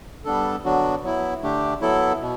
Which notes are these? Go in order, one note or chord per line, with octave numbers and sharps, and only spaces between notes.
G3 B3 D4 A4
D3 F#3 B3 D4 F#4
F#3 B3 E4
D3 A3 D4 G4
F#3 B3 E4 A4
B2